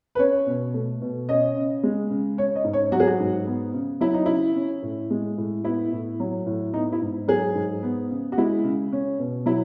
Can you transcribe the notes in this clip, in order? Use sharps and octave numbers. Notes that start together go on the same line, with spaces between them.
B4
C#4 C#5
B2
A3
B2
C#4 D#5
C#3
G#3
C#3
C#4 C#5
D#5
G#2
C#5
F#3 F#4
G#4
F#4
G#2
B3
C#3
F#3 E4
D#4
C#3 E4
C#4
A2
G#3
A2
B3 E4
A2
F#3
A2
B3 D#4
E4
G#2
F#3 G#4
G#2
B3
C#3
F#4
G#3 E4
C#3
C#4
B2
F#3 E4